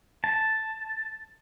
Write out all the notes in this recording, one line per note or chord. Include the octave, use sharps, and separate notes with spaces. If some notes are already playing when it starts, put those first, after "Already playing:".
A5